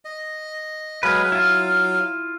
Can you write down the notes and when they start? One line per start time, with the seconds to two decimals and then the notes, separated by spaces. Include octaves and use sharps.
0.05 D#5
1.03 F#3 G#3 B4 F5
1.32 E4 F4